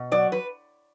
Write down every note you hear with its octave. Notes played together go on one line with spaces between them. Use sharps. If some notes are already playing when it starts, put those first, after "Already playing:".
Already playing: B2
F#3 D5
B4